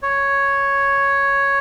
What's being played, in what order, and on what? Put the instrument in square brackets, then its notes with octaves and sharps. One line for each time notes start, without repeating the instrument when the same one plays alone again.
[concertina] C#5